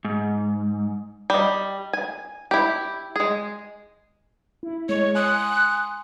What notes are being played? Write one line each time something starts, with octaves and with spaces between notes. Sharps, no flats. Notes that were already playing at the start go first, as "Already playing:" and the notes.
G#2
G3 D#5
G#5
E4 G4
G#3 G#4
E4
G#3 C#5
G#5 C6 D#6 F#6